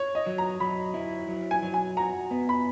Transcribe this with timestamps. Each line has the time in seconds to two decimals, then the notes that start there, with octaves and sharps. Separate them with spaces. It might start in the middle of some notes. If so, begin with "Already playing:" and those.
Already playing: C#5
0.15 D#5
0.26 F#3
0.38 A#5
0.60 F#3 B5
0.94 E4
1.29 F#3
1.51 G#5
1.62 F#3
1.74 G#5
1.97 F#4 A#5
2.31 B3
2.49 B5